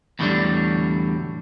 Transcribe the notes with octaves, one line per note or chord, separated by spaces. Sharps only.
E2 A2 D3 F#3 G3 D4